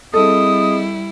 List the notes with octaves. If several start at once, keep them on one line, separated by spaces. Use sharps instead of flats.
G3 C4 E4 G#4 A4 D#5 D#6